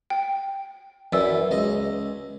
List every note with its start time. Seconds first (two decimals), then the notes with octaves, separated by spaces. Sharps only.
0.10 G5
1.13 F#2 E3 D5 E5 E6
1.51 C#2 D#5